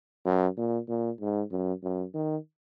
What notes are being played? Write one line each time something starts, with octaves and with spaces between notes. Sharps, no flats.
F#2
A#2
A#2
G#2
F#2
F#2
D#3